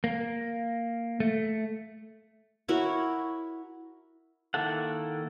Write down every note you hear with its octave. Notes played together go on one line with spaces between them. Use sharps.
A#3
A3
E4 F#4 A#4 C#5
D#3 A#3 E4 A4 F#5